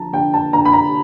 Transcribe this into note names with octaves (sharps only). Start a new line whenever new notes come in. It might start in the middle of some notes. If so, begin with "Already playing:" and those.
Already playing: D3 F3 A5 A#5
D3 G5
A5
D3 A#5
B5
A#5